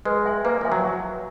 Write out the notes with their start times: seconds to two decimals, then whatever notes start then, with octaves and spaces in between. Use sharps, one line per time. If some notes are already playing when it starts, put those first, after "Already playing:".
0.05 G#3 B4
0.25 E5 G#5 C6
0.45 A#3 B4
0.61 F3 E5 G#5 C6
0.72 F#3